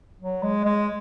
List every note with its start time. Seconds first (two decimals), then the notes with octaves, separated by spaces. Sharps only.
0.21 F#3
0.43 G#3
0.65 G#3